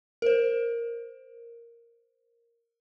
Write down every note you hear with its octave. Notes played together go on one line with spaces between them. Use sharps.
A#4 C5